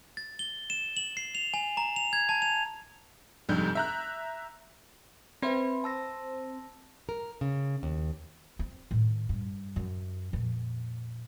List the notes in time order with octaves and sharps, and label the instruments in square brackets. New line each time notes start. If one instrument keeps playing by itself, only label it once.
[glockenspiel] A6
G7
E7
F#7
C7
F7
G#5
A#5
F7
G#6
A5
F7
[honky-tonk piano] F1 F2 G#2 G3 D4 G6
E5 A#5 F#6
[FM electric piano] C4 C5 [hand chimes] B4 E5 B5
[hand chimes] A5 E6 A#6
[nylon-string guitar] A#4
C#3
D#2
[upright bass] C4
A2 D#3
G2
F#2
F2 A#2